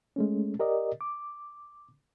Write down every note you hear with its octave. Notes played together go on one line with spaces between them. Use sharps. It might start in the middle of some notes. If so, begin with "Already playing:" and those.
G#3 A3 C#4
G4 A#4 D5 D#5
D6